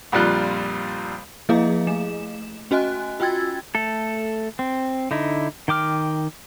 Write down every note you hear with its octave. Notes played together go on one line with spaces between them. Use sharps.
A#1 F2 A#2 G3 F4 F#6
F3 A#3 E4 G#4 D#5 F5
A3 E7
C#4 F#4 D#5 G#5 F#6
F4 F#4 G5 E6 G#6 A6
A3 A4
C4
D3 D#4 E4
D#3 G5 D6 F6